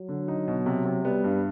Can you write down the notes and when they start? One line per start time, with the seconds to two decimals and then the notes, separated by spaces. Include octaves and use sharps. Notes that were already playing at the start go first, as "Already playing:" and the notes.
Already playing: F#3
0.09 D3
0.28 D#4
0.48 B2
0.66 C3
0.85 C3
1.04 G3 B3
1.24 G2